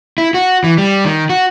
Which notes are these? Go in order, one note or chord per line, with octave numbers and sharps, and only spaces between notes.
E4
F#4
E3
G3
D#3
F#4